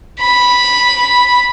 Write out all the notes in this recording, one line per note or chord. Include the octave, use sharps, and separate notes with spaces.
B5